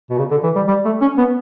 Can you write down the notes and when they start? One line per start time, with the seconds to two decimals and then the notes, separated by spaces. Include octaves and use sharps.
0.10 B2
0.18 C#3
0.31 D3
0.43 E3
0.56 G3
0.68 G3
0.85 A3
1.01 C#4
1.18 B3